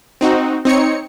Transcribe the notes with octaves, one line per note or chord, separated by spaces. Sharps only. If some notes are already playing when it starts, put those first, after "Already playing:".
C4 D#4 F#4
C4 D#4 C#5 C#7